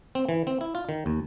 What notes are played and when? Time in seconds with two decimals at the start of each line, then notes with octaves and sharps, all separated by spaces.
0.15 C4
0.29 E3
0.47 C4
0.61 E4
0.75 F4
0.89 D#3
1.06 D#2